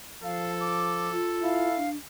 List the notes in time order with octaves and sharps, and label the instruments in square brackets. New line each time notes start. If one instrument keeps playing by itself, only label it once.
[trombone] F3 [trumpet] A4 [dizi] F5
[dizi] D6
[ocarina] F4
[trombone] E4 [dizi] F5
[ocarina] D4